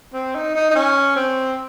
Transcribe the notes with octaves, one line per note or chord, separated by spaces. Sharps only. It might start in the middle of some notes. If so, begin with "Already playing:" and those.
C4
D#4
D#4
D#4
C#4
C4